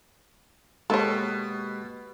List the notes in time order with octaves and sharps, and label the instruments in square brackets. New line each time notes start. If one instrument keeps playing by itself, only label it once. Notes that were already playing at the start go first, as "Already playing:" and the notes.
[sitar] B2 [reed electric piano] G#3 A#3 G4 [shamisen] A4 C#5